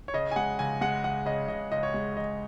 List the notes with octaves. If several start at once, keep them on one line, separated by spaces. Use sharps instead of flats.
C#5
C#3 D#5
G#5
G#3 F#5
C#2 G#5
G#3 F#5
C#2 F#5
C#3 D#5
C#2 D#5
C#2 D#5
C#5
G#3
C#2 D#5